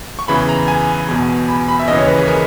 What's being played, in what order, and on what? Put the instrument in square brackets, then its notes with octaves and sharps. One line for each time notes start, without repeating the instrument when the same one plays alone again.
[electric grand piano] C#6
E2 C#3 E3 B5
A#5
G#5
E2 B2
B5
B5
E5
D#2 C#3 E3 D#5
C#5
B4
G#4
A#4